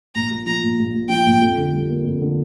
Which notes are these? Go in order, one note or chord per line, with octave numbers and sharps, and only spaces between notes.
A#1 A#5
A#2
F3 A#5
A#1
A#1
A#2
F3 G5
A#1
F2
D3
G3
A#3
F2
D3